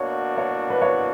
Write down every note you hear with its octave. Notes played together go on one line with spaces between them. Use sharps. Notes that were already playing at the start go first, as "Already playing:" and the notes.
Already playing: B2 A#3 D4 F#4 C#5
C#5
B4
C#5